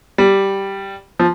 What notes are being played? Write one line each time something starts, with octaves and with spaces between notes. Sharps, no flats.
G3
F3